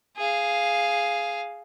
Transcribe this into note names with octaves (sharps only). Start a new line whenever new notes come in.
G#4 F5